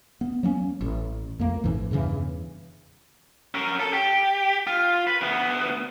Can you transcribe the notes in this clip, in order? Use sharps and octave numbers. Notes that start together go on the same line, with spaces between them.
B3
F#3 A#3 C#4
A1
F2 A3 A#3
A1 G#2 E3
E2 G2 C#3 E3
C#4 A#4
A4
G4
F4
B4
D2 B3